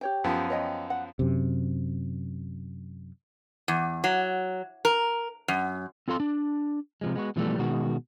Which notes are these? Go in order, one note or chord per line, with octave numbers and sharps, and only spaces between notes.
G4 C#5 G5
F#2 F3 B3
C#5 D#5 G5
F#5
F#2 C3
E2
F#3
A#4
F#2
C4 F4 A4 F5 C6
D4
C3 F3 G#3
G#3 B3 F#4
B2 D3 E3 F3 G3 A3
B2 D#3 G#3 F#4